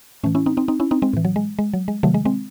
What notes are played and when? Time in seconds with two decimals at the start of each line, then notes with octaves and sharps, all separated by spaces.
0.24 A2 E3 A3 C#4
0.35 C#4 E4
0.46 C4 D#4
0.57 C4 D#4
0.68 C4 D#4
0.80 C#4 E4
0.91 C4 D#4
1.02 G#3 C4
1.13 A2 E3
1.25 F#3
1.36 G#3
1.59 G#3
1.74 F#3
1.88 G#3
2.03 C3 D#3 F#3 A3
2.14 G#3
2.25 G#3 C4